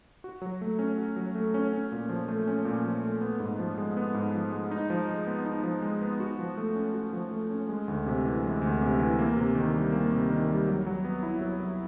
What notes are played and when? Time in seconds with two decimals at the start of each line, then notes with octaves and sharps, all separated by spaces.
0.24 F#4
0.42 F#3
0.61 A3
0.79 C#4
0.98 F#4
1.16 F#3
1.35 A3
1.54 C#4
1.73 C#4
1.92 A#2
2.09 F3
2.28 A3
2.47 C#4
2.65 A#2
2.84 F3
3.02 A3
3.22 B3
3.40 G#2
3.59 F3
3.78 G#3
3.97 B3
4.14 G#2
4.34 F3
4.52 G#3
4.71 D#4
4.90 F3
5.09 G#3
5.27 B3
5.46 D#4
5.63 F3
5.82 G#3
6.01 B3
6.20 F#4
6.39 F3
6.57 A3
6.75 C#4
6.94 F#4
7.13 F3
7.31 A3
7.50 C#4
7.69 G#3
7.88 D2
8.06 C3
8.25 E3
8.43 G#3
8.62 D2
8.81 C3
8.99 E3
9.19 A#3
9.36 C3
9.55 D#3
9.73 G3
9.92 A#3
10.11 C3
10.30 D#3
10.49 G3
10.68 F#3
10.86 F#3
11.05 B3
11.23 E4
11.41 F#3
11.60 F#3